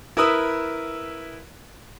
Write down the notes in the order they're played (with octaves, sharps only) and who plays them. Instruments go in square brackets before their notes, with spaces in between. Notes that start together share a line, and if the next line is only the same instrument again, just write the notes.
[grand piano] E4 A#4 B4 D#6 E6